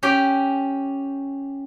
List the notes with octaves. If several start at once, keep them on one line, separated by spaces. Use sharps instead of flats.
C#4 G4 G5